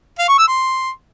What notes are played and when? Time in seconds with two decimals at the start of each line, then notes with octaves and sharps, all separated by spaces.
0.19 F5
0.29 C#6
0.38 E6
0.48 C6